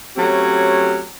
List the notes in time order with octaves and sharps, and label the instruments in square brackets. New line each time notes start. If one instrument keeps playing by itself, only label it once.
[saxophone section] F#3 A3 C4 C#4 G4